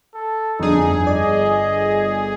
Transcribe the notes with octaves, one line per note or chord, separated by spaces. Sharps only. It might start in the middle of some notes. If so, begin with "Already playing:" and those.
A4
G1 F2 D4 D#4 G#4
D5 D#5